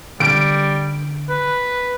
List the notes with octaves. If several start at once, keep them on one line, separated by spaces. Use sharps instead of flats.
D3 G3 D7
B4